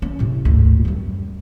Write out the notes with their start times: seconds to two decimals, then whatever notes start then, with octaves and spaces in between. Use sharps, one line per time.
0.02 C#4
0.19 A2 C3
0.45 D2 G#2
0.85 F#2 G3